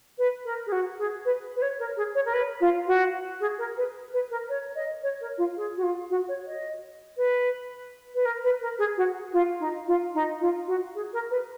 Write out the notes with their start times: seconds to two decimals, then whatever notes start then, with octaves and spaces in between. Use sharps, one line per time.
0.18 B4
0.45 A#4
0.67 G#4
0.72 F#4
0.99 G#4
1.25 B4
1.56 B4
1.62 C#5
1.79 A#4
1.97 G#4
2.15 C#5
2.26 A#4
2.33 B4
2.61 F4
2.87 F#4
3.40 G#4
3.59 A#4
3.77 B4
4.13 B4
4.31 A#4
4.49 C#5
4.76 D#5
5.03 C#5
5.21 A#4
5.38 F4
5.57 G#4
5.77 F#4
5.83 F4
6.10 F#4
6.29 C#5
6.46 D#5
7.17 B4
8.15 B4
8.25 A#4
8.44 B4
8.61 A#4
8.79 G#4
8.97 F#4
9.33 F4
9.60 D#4
9.87 F4
10.14 D#4
10.41 F4
10.67 F#4
10.95 G#4
11.13 A#4
11.31 B4